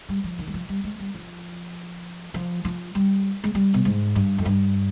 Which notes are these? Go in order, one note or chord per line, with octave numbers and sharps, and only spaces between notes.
G3
F3
D#3
G3
F3
G3
G#3
G3
F3
F3
F3
G3
G#3
G3
B2
G#2
G2
F2
G2